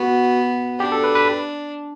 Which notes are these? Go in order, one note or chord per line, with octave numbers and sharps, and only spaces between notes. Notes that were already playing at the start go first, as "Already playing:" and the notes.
Already playing: B3 F#4
D4 G4
A4
B4
B4